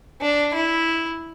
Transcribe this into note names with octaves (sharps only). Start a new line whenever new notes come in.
D4
E4